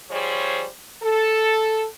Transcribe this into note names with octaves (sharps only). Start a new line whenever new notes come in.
F3 G3 G#4 C5 C#5
A4